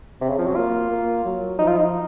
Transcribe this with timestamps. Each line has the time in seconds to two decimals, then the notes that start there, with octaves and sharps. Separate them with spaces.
0.21 C3 C4
0.29 C#3
0.38 F3
0.47 F#3
0.56 A#3 F4
0.90 A#3
1.25 F#3
1.59 F3 D#4
1.68 F4
1.78 D#4